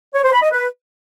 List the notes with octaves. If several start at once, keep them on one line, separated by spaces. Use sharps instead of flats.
C#5
C5
B5
D#5
B4